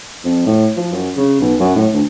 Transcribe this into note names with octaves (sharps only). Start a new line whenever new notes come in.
F2
A2
F3
F#2
C#3
B1
F#2
A2
D2